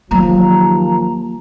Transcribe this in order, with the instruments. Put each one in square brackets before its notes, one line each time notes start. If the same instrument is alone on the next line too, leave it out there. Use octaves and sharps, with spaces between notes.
[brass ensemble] D#2 F3 [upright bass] F#3 A#3 [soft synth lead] A#5